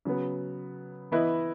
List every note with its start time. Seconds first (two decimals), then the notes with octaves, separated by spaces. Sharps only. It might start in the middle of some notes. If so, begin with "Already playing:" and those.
0.05 C#3 F#3 B3
1.12 E3 B3 E4 B4 D#5